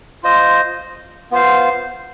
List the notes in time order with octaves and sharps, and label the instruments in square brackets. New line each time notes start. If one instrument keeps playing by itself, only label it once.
[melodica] F4 C5 D#5
B3 F4 C5 F5